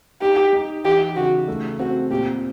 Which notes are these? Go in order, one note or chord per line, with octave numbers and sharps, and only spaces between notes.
D#4 G4
D#4
E3 G4
C#3 F#4
A3
C4 F#4
A#2 G4